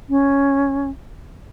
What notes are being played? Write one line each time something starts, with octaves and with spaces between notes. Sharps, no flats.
C#4